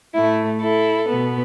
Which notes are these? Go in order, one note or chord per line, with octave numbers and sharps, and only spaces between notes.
A2 A3 E4
E4 A4
B2 B3